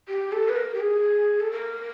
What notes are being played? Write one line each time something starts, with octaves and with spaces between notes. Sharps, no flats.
G4
A4
B4
A#4
G4
G#4
A4
A#4